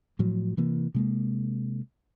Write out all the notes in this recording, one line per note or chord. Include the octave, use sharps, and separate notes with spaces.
A2 F3 F#3
C3 E3 A#3
C3 G#3 A#3